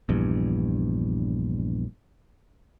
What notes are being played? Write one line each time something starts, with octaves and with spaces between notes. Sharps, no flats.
A#1 E2 G2